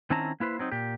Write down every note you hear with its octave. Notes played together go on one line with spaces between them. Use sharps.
D#3 C4 C#4 E4 A5 A#5
A#3 E4 B4 C5
F#3 C4 D#4
A#2 G4